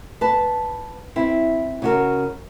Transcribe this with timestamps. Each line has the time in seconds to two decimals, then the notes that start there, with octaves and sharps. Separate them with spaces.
0.21 B4 A5
1.16 C4 E4
1.82 C#3 F#4 A#4